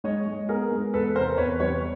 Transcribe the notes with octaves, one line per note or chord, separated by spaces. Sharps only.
G#3 C#5 D#5
G#3
B3 G#4 A#4
G#3
E2 A4 B4
C3 A#4 C5
E2 B4 C#5
G3 B4 C#5